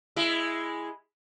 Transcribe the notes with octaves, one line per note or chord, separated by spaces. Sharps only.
G#3 E4